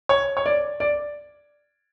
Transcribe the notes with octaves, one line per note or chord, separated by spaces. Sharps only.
C#5
C#5
D5
D5